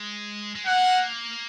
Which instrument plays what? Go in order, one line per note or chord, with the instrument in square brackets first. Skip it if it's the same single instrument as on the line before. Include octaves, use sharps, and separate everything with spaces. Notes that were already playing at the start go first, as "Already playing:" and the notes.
Already playing: [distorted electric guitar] G#3
G#3
[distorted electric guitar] A#3 [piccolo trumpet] F#5